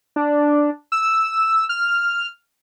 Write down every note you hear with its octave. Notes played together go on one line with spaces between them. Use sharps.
D4
E6
F6